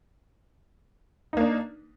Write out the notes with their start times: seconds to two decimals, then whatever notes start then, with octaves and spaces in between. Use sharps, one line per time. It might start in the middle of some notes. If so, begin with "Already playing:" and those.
1.33 D#4
1.37 A#3
1.41 D4